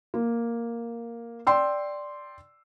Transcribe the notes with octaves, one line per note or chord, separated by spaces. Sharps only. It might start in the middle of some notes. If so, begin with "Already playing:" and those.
A#3
D5 G5 C6 E6